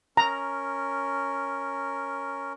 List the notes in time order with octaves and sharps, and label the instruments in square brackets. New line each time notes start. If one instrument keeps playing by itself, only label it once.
[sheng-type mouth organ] C#4 A#4 [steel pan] A#5